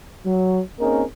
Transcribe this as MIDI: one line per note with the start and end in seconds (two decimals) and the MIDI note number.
0.26 0.60 54
0.80 1.03 58
0.80 1.03 60
0.80 1.03 61
0.80 1.03 63
0.80 1.03 68
0.80 1.03 70